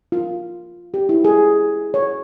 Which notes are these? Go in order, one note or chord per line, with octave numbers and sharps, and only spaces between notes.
F4
G4
E4
G#4
C#5